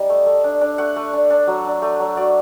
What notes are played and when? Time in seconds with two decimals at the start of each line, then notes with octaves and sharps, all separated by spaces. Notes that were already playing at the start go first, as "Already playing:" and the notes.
Already playing: G3 D#4 D#5
0.09 A3 A5
0.26 A3
0.44 D4
0.61 D4
0.78 A3 F#5
0.96 A3
1.13 D4
1.30 D4
1.47 F#3
1.65 D4
1.82 A3
1.99 F#3
2.17 F#3 D5